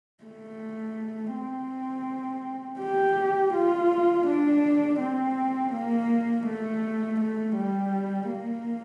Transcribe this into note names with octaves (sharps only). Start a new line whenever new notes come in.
A3
C4
G4
F4
D4
C4
A#3
A3
A3
G3
A#3